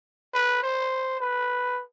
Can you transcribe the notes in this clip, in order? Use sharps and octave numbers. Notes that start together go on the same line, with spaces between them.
B4
C5
B4